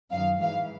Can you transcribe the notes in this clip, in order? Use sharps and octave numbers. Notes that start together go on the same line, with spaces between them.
F#2 D#3 F5
G#2 E3 F5